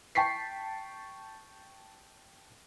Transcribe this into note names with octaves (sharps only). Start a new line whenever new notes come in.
G5 A5 C#6 B6 C7